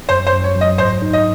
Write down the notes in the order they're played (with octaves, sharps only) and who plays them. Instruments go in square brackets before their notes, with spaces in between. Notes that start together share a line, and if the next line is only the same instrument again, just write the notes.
[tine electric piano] F#2 [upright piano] C5
[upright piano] C5
[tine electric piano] F#2
[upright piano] C#5
[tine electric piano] F#3
[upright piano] D#5
[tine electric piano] G#2 [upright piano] C5
[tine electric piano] D#4
[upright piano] D#5